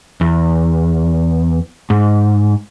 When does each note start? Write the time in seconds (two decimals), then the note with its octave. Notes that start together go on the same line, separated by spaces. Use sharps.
0.21 E2
1.90 G#2